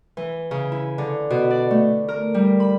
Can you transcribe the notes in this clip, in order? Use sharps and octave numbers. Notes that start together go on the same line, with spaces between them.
E3
C#3
E4
D3
B2
D5
A3
A#4
G3
B5